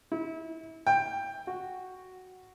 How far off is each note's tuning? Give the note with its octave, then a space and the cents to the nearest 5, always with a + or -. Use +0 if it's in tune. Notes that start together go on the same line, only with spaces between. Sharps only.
E4 -30
G5 +15
F#4 +0